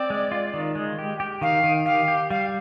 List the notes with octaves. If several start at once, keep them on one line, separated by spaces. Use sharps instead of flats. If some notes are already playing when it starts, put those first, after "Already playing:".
Already playing: C4 D5
G#3
F4
D#3
G#3
G4
G4
D#3 F5
D#3
G4 F5
G4
G3 F5